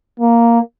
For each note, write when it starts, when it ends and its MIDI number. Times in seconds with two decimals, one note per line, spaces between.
0.20 0.59 58